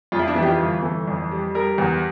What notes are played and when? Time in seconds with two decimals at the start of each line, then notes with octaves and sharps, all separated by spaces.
0.12 F2 F4
0.19 E4
0.28 D4
0.35 E3 E4
0.43 G4
0.48 F4
0.59 G1
0.83 E3 A4
1.08 F2
1.31 G3
1.55 G3 A#4
1.78 E2